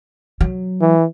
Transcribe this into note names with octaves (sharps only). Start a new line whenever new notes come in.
F#3
E3